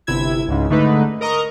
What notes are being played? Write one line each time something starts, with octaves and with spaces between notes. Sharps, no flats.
G1 C3 E4 E6 G#6
C#2 G#2 C#3
G#2 D3 A3 D#4 B4
A#4 D#5 A#5 C#6 D#6